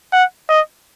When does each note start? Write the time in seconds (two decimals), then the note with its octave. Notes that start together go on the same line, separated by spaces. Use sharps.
0.13 F#5
0.49 D#5